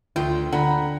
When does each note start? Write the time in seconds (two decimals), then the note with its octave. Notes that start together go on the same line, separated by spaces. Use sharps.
0.16 D2 F4 G5
0.52 D3 F#5 A#5 B5